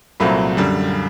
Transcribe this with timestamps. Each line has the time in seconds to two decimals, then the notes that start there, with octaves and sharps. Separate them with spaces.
0.20 C2 A#2 F#3 A3 C4 B5
0.57 F#2 D3 G3